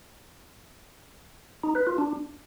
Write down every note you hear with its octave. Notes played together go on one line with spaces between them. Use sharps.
D#4
B4
F4
D4